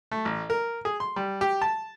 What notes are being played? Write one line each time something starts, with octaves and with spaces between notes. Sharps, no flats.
A3
A1
A#4
G#4
C6
G3
G4
A5